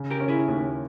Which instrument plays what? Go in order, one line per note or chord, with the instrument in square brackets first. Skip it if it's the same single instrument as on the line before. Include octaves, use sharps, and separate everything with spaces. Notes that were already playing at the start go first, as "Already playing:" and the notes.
Already playing: [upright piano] C#3
[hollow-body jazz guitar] G4 A#4
[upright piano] C#4
[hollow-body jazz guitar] E4 G#4
[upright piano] D#2